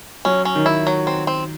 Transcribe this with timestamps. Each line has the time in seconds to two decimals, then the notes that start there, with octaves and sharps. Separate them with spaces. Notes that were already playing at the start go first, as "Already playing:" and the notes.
0.25 F#3 C#4
0.45 C#4
0.55 D#3
0.66 E4
0.87 F#3
1.07 C4
1.27 C4